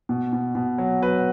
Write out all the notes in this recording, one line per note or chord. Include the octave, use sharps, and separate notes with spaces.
B2
B2
B2
F#3
F#3 B4